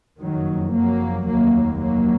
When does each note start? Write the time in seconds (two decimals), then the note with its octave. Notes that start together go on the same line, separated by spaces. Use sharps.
0.19 F#1 F2 D#3 F#3
0.73 F#3 A#3
1.27 F1 D#2 F#3 A#3
1.80 F#3 A#3